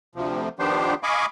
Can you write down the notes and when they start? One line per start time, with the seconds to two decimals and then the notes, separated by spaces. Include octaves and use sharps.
0.15 D2 C3 F3
0.59 D#3 F3 B3 D4 G4 C5
1.03 D#5 F5 G#5 B5 C#6 D6